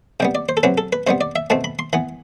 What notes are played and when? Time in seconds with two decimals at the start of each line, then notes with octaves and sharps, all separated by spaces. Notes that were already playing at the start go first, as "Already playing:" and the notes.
0.20 C3 G3 B3 G5
0.35 D5
0.49 C5
0.57 A4
0.63 C3 F#3 C4 B4
0.78 A4
0.93 B4
1.07 C3 G3 B3 C5
1.21 D5
1.36 E5
1.50 B2 A3 C4 A5
1.64 B5
1.79 C6
1.93 E3 B3 B5